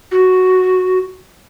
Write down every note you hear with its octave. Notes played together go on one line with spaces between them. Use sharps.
F#4